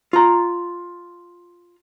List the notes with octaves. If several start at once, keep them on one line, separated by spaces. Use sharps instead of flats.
F4 A#5